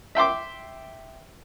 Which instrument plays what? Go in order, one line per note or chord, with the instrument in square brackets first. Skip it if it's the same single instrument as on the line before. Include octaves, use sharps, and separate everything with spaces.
[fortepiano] E5 G5 C6 D6